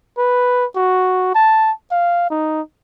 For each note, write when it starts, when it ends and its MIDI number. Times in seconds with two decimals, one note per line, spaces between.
0.18 0.65 71
0.76 1.32 66
1.35 1.72 81
1.91 2.26 77
2.30 2.62 63